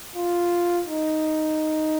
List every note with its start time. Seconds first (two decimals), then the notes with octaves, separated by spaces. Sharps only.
0.16 F4
0.87 D#4